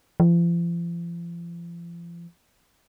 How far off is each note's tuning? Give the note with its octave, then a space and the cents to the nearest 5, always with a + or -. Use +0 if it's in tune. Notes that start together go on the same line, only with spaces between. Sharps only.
F3 -40